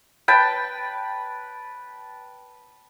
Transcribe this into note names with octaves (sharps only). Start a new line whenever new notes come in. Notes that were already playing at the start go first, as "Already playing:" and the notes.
B4 G5 A5